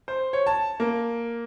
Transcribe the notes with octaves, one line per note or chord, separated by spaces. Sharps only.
C5
C#5
A5
A#3